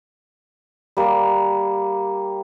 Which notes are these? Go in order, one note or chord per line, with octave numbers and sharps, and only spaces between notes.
G3 A#3